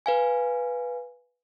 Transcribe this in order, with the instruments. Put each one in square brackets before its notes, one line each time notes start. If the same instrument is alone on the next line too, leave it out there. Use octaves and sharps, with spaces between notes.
[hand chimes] B4 F5 G#5